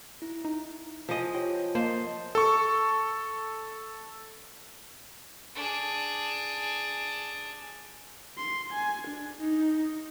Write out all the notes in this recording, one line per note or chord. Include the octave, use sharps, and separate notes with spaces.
E4
D#4
F3 D#5 G#5 A5
F4 G4 C#5 G5
A#3 C5 D#5 A5
A4 C#6
D4 G#4
C6
G#5
D4
D#4